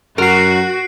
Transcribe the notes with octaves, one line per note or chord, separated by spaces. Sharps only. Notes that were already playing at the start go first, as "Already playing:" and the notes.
F#2 F#4 A#4 C7 D7